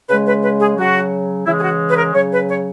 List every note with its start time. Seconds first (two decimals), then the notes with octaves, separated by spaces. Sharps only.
0.09 C#3 B4
0.13 G#3
0.27 B4
0.43 B4
0.61 G#4
0.78 C#3 F#3 F#4
1.46 C#3 E3 G#3 E4
1.58 G#4
1.63 F#4
1.89 B4
1.97 A#4
2.14 C#3 F#3 C#5
2.32 B4
2.49 C#5